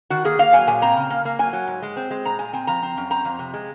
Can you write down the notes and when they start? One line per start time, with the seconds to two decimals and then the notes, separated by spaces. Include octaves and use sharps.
0.10 D#3 F#4
0.24 A#3 G#4
0.39 A#3 F5
0.53 F#3 G#5
0.67 A#2 G#5
0.82 C4 A#5
0.96 C#3
1.10 A#3
1.25 A#3
1.39 F#3 G#5
1.53 F#3
1.67 G#2
1.82 G#3
1.97 C4
2.10 G#3
2.25 A#2 A#5
2.39 A#2 G#5
2.53 C4 G#5
2.67 F3 A#5
2.82 C4
2.97 F#2
3.10 C4 A#5
3.25 F2
3.39 C3
3.54 G#3